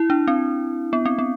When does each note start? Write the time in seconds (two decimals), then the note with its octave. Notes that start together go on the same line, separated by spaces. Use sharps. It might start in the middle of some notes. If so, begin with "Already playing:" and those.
Already playing: E4
0.10 D4
0.28 C4
0.93 B3
1.06 C4
1.19 B3